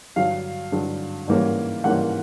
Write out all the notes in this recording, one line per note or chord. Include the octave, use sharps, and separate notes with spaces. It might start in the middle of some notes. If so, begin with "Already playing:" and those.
G2 D3 F#3 F5
G2 D3 F#3
G#2 E3 G3 A#3 C#4
G#2 E3 G3 A#3 C#4 F#5